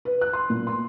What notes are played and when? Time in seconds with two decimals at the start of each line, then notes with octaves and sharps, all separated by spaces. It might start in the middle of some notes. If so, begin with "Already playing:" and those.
0.05 B4
0.21 F#6
0.33 C6
0.50 A#2
0.67 C6